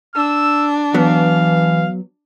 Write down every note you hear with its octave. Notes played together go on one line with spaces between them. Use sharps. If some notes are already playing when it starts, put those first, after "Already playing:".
D4 E6
E3 F#3 B3 F5